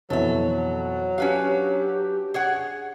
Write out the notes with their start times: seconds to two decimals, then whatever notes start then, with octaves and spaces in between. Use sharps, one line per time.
0.10 F2 B2 E3 F#3 A4 E5
1.18 C#4 D4 F#4 G4 B4 F5
2.34 G#4 C#5 F#5